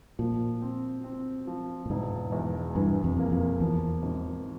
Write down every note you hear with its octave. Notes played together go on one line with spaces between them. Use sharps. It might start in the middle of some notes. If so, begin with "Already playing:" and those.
A#2 F3
C4
C4
F3
A#2
E1 G#2
E2
G2 E3
F2
A#3
F2
E2 F3
G#1